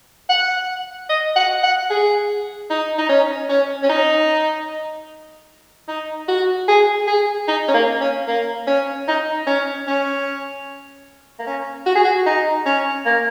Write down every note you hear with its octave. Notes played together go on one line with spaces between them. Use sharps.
F#5
D#5
F#5
F#5
G#4
D#4
D#4
C#4
C#4
C#4
D#4
D#4
F#4
G#4
G#4
D#4
C#4
A#3
C#4
A#3
C#4
D#4
C#4
C#4
A#3
C#4
F#4
G#4
F#4
D#4
C#4
A#3